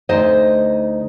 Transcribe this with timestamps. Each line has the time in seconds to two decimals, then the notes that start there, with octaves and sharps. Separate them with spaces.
0.09 D2 D#4 C5 D#5